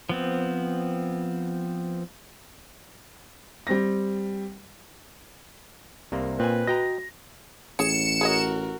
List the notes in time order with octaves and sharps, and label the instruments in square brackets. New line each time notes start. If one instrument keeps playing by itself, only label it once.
[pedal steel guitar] F3 B3 C4
[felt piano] G3 C4 A#6
[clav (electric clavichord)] C2 C3 A#3
[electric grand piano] A#2 [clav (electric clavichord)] C4 G#5 [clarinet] B4
[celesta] F#4 [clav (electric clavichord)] D#5 G5 A#5 [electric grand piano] A#6
[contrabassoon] A1 [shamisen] G#4 C#5 [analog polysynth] C#7 E7
[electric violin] F#4 A#4 [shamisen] G#4 C#5 D#5